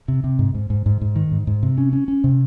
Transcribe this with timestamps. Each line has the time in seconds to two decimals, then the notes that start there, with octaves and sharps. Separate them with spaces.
0.08 C3
0.24 C3
0.39 G#2
0.54 G#2
0.70 G#2
0.86 G#2
1.01 G#2
1.16 D#3
1.32 G#2
1.47 G#2
1.63 C3
1.78 C#4
1.93 C#4
2.08 C#4
2.24 C3